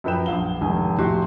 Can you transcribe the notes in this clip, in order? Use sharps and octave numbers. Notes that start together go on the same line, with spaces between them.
F#2 F3 B4 G5 E7
A#1 F5 F#5 G7
F1 G#2 D#3 G#5
F1 A2 F#4 G4 C6